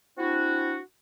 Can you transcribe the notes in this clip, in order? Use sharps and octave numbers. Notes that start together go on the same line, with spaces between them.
C4 D4 E4 F#4